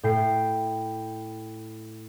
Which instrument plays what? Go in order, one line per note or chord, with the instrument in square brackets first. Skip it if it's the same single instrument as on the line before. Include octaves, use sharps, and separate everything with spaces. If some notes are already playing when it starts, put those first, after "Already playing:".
[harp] A2 G5 C7